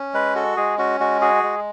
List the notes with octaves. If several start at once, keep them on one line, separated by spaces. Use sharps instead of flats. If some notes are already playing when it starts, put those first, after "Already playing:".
Already playing: C#4
G#3 B4
F#4 A4
G#3 G#4
C#4 F#4
G#3 F#4
F#4 G#4
G#3